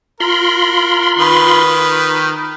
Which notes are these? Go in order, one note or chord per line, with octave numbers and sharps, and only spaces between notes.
F4 A#4 B5 C6
D#3 B4